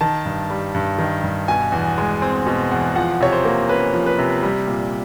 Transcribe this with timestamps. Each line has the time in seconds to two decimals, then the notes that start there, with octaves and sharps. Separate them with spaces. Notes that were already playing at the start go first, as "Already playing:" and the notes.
0.01 D#3 A5
0.25 G2
0.50 G3
0.75 G2
0.99 D#3
1.23 G2
1.48 B2 G#5
1.72 E2
1.98 G#3
2.22 C4
2.46 B2
2.71 E2
2.96 F3 F#5
3.21 C3 C#5
3.32 C5
3.45 A#3
3.69 C#4 B4
3.94 F3
4.06 B4
4.19 C3
4.43 G3
4.67 A#2